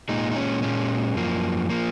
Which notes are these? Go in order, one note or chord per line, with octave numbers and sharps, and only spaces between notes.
A#2 G#3 D#4
D#4
C#4
A#2 G#3 C#4
F#2 F3 A#3
F3 A#3